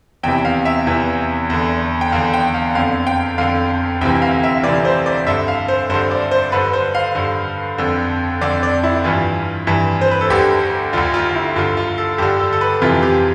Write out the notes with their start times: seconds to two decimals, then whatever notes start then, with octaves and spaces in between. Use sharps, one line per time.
0.23 E2 C3 E3 G5
0.45 F5
0.65 E5
0.86 E2 C3 E3
1.50 E2 D3
2.01 G5
2.12 E2 D3 F5
2.34 G5
2.54 F5
2.75 F2 D3 F5
3.07 G5
3.38 F2 D3 F5
4.01 D2 C3 E3 G5
4.22 F5
4.43 E5
4.64 D2 C3 E3 D5
4.85 C5
5.06 D5
5.27 G2 D3 E5
5.48 F5
5.68 C5
5.90 G2 D3 C5
6.11 D5
6.31 C5
6.52 G2 D3 B4
6.73 C5
6.95 F5
7.15 G2 D3
7.78 F2 D3
8.41 F2 D3 D5
8.63 D5
8.83 E4
9.04 G2 E3 F4
9.67 G2 E3
10.01 C5
10.11 B4
10.21 A4
10.30 D2 D3 G4
10.93 D2 D3 F4
11.14 F4
11.35 E4
11.56 G2 D3 F4
11.77 F4
11.98 A4
12.18 G2 D3 G4
12.40 A4
12.53 A4
12.61 B4
12.82 F2 C3 E3 F4
13.02 G4